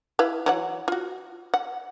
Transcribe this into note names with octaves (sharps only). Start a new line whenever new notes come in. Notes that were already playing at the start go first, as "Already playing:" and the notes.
E4 B4 F5
E3 F#3 F#5
F4 F#4
F#5